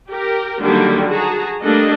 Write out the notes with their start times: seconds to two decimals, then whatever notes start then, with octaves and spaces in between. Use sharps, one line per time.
0.10 G4 A#4
0.62 D3 D#3 F#3 G3 A#3 G4
1.09 F#4 G#4 A5 A#5
1.62 G3 A3 A#3 D4 A4 D#5